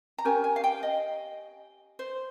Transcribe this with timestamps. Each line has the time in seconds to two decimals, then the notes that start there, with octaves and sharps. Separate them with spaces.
0.18 A#5
0.25 C#4 G4 A#4 G#5
0.44 G#5
0.56 F5
0.64 G5
0.83 D#5
1.99 C5